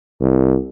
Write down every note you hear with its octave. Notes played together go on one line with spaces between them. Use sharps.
C2